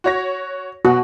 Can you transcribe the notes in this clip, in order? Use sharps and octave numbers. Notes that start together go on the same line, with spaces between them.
F#4 C#5 A#6
B2 F#4